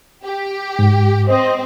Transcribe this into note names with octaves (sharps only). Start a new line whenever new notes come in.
G4
G#2
C4 C5 D#5